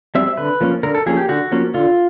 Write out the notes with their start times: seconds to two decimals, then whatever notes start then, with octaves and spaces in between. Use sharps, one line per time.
0.15 G3 C4 E5
0.37 D3 B4
0.61 F3 A#3 C#4
0.83 D3 A#4
0.95 A4
1.06 F3 A#3 C#4 G#4
1.17 G4
1.28 D3 F#4
1.52 F3 A#3 C#4
1.74 D3 F4